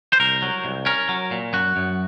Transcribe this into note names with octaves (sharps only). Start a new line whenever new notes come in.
C5
C2 A#4
F#3
C2
C#4 A#4
F#3
A#2
F#2 F#4
F#2